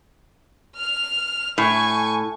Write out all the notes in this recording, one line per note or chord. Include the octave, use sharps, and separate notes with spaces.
F6 F7
A2 G#5 C#6